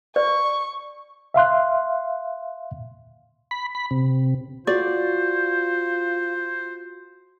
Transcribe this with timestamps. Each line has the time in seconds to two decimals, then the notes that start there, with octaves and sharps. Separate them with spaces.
0.16 D5 C#6
1.34 E5 F5 C6 F#6
3.51 B5
3.75 B5
3.91 C3
4.67 F4 F#4 C5 D5